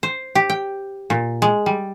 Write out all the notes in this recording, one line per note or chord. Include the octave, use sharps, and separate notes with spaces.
C5
G4
G5
A#2
G#3
G3